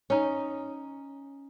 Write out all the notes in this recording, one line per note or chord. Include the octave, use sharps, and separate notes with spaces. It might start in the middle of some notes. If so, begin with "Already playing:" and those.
C#4 D#4